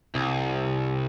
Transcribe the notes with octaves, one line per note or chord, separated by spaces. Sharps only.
C2